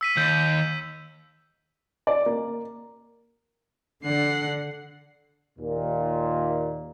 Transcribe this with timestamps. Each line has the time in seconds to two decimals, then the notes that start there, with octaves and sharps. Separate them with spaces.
0.01 E6 B6 D#7
0.17 D#2 G6
2.07 D5
2.26 A#3
4.05 D3 F#5 C7
5.59 D#2 A#2